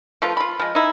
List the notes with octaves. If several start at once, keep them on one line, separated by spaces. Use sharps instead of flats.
F3 A3 F4 B4
F4 B5
F3 G#3
D#4 E4